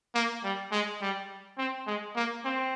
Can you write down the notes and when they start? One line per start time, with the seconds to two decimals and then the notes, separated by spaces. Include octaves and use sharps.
0.15 A#3
0.44 G3
0.72 G#3
1.01 G3
1.58 C4
1.87 G#3
2.16 A#3
2.45 C4